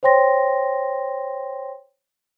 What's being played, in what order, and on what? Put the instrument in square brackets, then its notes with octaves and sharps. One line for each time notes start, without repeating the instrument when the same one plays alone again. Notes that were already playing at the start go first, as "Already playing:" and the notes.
[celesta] C5 C#5 G5 C6 A#6